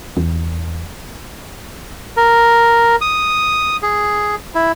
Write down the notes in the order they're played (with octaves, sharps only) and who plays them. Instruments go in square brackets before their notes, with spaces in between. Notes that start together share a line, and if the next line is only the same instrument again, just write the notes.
[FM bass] E2
[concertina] A#4
D#6
G#4
E4